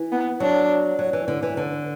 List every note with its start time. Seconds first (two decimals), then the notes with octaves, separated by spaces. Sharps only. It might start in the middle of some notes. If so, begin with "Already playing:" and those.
Already playing: E3
0.12 B3
0.40 F#3 D4
0.99 F#3
1.13 E3
1.28 D3
1.43 E3
1.57 D3